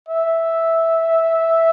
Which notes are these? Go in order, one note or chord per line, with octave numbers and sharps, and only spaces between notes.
E5